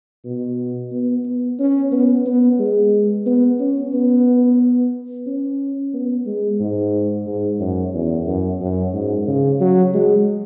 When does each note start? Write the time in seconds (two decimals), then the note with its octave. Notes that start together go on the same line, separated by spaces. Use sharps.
0.25 B2
0.92 B3
1.26 B3
1.59 C#4
1.92 B3
2.26 B3
2.59 G#3
3.26 B3
3.60 C#4
3.93 B3
5.26 C#4
5.93 B3
6.26 G#3
6.60 G#2
7.27 G#2
7.60 F#2
7.94 E2
8.27 F#2
8.61 F#2
8.93 G#2
9.27 C#3
9.60 F#3
9.94 G#3